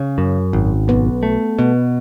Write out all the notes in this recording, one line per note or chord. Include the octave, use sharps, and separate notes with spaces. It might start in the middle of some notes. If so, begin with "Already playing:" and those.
Already playing: C#3 C#4
F#2
G#1
B1 B3
A3
B2 B3